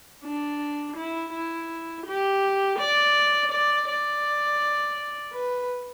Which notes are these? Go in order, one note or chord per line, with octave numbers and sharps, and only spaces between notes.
D4
E4
E4
G4
D5
D5
D5
B4